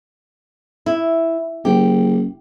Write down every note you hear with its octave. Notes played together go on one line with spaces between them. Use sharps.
E4
F#1 G4